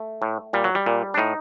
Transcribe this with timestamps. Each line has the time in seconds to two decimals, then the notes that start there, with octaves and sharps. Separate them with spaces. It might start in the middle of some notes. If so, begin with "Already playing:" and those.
Already playing: A3
0.22 A2
0.53 A#2 G3
0.64 F#3
0.75 G3
0.86 A#2
1.14 D4
1.17 A2 D#4